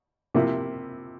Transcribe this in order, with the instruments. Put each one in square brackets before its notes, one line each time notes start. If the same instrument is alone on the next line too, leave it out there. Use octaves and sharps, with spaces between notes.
[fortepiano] C3 F3 A#3 E4